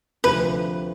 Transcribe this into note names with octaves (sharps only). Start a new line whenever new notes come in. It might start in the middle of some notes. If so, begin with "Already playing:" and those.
D2 C3 F3 B4